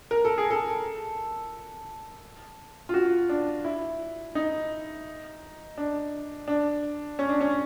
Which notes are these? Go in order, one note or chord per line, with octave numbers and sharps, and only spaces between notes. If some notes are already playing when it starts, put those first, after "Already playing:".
A#4
A4
G#4
A4
F4
F#4
D4
E4
D#4
D4
D4
C#4
D4
C#4